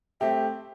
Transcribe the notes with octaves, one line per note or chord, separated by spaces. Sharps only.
A3 C4 G4 E5